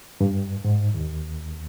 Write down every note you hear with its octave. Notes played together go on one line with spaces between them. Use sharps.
G2
G#2
D#2